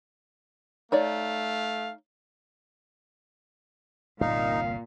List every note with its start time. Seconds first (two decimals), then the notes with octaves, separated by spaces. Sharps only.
0.92 A3 D#4 C#5 D5 F5
4.21 G1 C2 A#2 D#4 F5